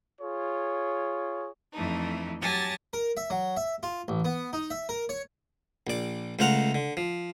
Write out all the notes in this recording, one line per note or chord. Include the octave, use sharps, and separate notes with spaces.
F4 G#4 C#5
F2 E3 A3 D4 D#4
F#3 G4 G#5 A5 A6 A#6
A#4
E5
F#3
E5
F4
A1
B3
D#4
E5
A#4
C#5
A#1 D5
C#2 A3 C5 F5 F#5 A#5
D3
F3